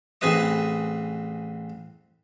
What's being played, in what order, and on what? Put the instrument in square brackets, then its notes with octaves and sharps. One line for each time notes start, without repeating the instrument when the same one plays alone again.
[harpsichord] A1 C4 G#4 B4 D#5 D#6